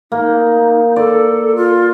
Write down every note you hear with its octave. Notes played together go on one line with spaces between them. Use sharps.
A#3 D#4
A4 D5
F4